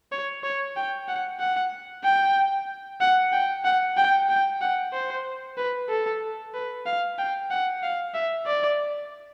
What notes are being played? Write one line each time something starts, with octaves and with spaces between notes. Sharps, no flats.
C#5
C#5
G5
F#5
F#5
G5
F#5
G5
F#5
G5
G5
F#5
C5
B4
A4
B4
F5
G5
F#5
F5
E5
D5